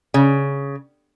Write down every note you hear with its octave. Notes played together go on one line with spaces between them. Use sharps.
C#3